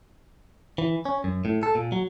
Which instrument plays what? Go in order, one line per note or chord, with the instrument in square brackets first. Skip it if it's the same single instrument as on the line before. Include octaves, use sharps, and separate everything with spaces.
[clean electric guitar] E3
C#4
F#2
A2
A4
A#2
F#3